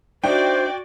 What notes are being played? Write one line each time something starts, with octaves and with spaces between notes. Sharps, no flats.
D4 D#4 F#4 C5 D5 E5 G5